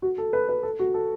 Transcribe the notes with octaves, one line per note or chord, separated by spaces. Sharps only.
F#4
A4
B4
B4
A4
F#4
A4